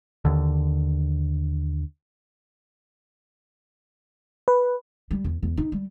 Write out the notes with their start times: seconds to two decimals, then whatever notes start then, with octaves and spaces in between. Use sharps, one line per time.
0.25 D#2 D3
4.48 B4
5.11 G3
5.24 E2
5.43 E2
5.57 D#4
5.72 G3